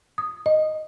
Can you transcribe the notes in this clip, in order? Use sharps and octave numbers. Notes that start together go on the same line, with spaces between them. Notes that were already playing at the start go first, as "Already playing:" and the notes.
D#6
D#5